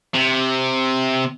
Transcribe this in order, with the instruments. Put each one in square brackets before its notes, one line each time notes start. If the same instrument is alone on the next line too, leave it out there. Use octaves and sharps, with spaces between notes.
[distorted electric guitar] C3